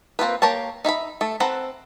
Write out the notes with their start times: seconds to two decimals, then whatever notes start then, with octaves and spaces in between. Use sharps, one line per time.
0.19 A#3 C4 F4 B4
0.42 A#3 G4 A#4 C#5 A5
0.85 D#4 E5 G#5 B5
1.21 A3 A4
1.40 C4 A4 B4 F#5 A#5